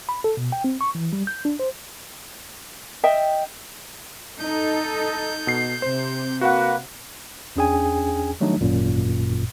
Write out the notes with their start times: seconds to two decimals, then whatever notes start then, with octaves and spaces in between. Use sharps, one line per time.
0.09 B5
0.24 A4
0.37 B2
0.52 G5
0.64 C4
0.81 C#6
0.95 E3
1.13 G3
1.27 G6
1.45 D4
1.59 C5
3.03 D#5 E5 G5
4.39 D#4 A4 G6
5.47 B2 C7
5.82 C3 C5
6.41 A#3 F#4 B4 F#5
7.56 E2 C#4 D4 G#4 G5 G#5
8.40 D#3 F#3 G3 A3 D4 D#4
8.61 G#1 F#2 A#2